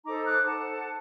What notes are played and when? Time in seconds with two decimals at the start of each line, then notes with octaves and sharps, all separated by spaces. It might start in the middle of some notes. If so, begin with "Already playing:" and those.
0.05 D#4 A4 C5 A#5 D6
0.26 D6 F#6
0.46 D#4 A4 C5 F#5 A5